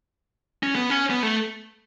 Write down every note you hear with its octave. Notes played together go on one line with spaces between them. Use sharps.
C#4
B3
C#4
B3
A3